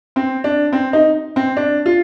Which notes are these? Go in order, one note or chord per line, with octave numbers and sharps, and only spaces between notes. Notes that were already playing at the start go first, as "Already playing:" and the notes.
C4
D4
C4
D#4
C4
D4
F4